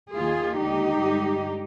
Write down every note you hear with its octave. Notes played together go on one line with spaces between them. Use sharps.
D#2 D#3 A#3 F4 G#4
D#2 D3 G#3 D#4 G4
G2 D3 G#3